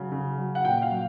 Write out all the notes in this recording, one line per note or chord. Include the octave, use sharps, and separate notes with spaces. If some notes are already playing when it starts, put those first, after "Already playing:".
Already playing: C#3 F#3
C#3
F#3
F#5
A#2 G5
F5
F#3